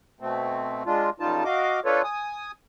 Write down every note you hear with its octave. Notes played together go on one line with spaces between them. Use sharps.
B2 A3 C4
G#3 D4 F4
F#2 C#3 G3 D#4 F4 A5
F#4 D#5 F5 D6
D4 F4 A4 B4 C#5
G#5 D#6